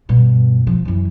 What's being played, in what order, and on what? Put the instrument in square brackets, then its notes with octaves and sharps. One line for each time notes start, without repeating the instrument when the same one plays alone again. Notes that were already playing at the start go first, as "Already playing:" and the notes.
[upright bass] G2 B2
F3
F#2 E3